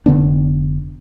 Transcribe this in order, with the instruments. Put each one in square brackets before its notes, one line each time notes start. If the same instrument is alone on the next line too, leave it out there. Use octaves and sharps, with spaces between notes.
[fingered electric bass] F1 D3 B3 D4